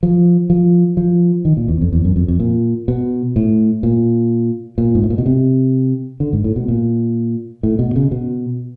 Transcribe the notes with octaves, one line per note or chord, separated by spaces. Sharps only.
F3
F3
F3
D#3
A#2
E2
F2
E2
F#2
F2
F2
A#2
B2
A2
A#2
A#2
G#2
A2
A#2
B2
C3
D3
G#2
A2
B2
A#2
A2
B2
C#3
B2